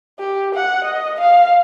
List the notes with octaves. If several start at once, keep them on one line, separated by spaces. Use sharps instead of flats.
G4
F#5
D#5
F5